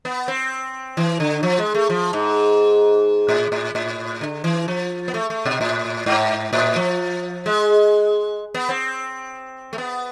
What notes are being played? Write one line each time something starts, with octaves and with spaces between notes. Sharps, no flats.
B3
C4
E3
D3
F3
G#3
A3
F3
G#2
A2
A2
A2
D3
E3
F3
B3
A3
A3
B2
A2
G#2
A2
F3
G#3
B3
C4
A3
B3